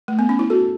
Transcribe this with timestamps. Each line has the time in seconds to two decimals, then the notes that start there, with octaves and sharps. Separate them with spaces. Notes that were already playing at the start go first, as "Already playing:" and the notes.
0.08 A3
0.19 B3
0.29 C#4
0.39 E4
0.50 F#4 A4